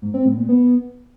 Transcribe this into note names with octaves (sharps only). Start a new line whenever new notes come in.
G#2
C4
A2
A#2
B3